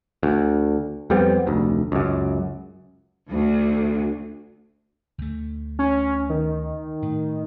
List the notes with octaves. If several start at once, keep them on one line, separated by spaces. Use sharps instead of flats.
D2
F2 G3 B3 C4
F1 D2
C#2 F#2
D2
D2 A3
C#4
D#3
A2